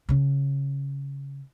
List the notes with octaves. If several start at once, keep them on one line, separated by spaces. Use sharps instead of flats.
C#3 C#4